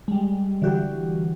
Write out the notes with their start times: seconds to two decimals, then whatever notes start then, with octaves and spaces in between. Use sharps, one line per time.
0.08 G3 G#3
0.62 D3 E3 G3 F#4 G4